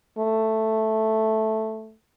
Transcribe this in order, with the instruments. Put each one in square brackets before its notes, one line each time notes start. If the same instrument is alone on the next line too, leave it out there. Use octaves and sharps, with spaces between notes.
[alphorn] A3